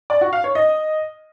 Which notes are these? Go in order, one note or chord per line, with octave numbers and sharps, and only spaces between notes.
D5
F#4
F5
C#5
D#5